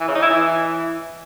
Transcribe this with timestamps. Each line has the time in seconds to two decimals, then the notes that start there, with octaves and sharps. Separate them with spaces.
0.01 E3
0.08 C#3
0.15 D#4
0.23 E4
0.30 E3